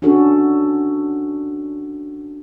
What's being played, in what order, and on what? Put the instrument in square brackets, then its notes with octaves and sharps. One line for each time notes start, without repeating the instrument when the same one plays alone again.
[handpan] C#4 D4 F#4 A4